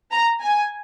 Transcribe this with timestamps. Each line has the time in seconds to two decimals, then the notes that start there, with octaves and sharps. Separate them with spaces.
0.12 A#5
0.41 G#5